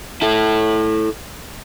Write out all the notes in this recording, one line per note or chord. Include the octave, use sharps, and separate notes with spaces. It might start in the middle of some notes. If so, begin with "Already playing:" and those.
E4 A4